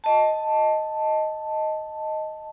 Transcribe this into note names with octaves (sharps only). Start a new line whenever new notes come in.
D#5 A5